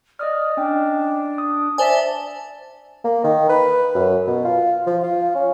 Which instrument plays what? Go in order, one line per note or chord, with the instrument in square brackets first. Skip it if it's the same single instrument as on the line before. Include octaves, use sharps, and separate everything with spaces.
[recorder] D5 [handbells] D#5 D#6 F6
[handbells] C#4 D#5 G5 [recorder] D4
[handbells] D#6
[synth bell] C5 G#5 [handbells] D5 E5 [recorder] A5
[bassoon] A#3
D#3
B4
F#2
B2
F4
F3
F4
C#4